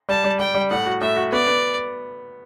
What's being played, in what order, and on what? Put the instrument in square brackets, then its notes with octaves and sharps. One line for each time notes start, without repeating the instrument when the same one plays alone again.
[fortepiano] G3 [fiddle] A5
[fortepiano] G3
[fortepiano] G3 [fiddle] G5
[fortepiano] G3
[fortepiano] A2 [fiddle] F#5
[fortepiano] F#4
[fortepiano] A2 [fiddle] E5
[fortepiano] F#4
[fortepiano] B3 [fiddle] D5
[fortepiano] B3